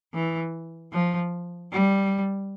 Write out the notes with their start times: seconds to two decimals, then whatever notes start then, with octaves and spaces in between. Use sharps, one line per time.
0.14 E3
0.92 F3
1.72 G3